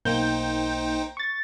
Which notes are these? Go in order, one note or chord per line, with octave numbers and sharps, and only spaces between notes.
B1 A#3 D#4 C5 G5 G6
C#6 A6